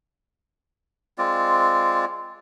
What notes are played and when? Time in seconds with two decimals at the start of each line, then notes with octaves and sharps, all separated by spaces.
1.18 G#3 C4 F4 D5